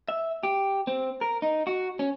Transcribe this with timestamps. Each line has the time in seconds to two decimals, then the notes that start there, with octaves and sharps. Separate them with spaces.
0.09 E5
0.43 G4
0.87 C4
1.21 A#4
1.42 D#4
1.67 F#4
1.99 C#4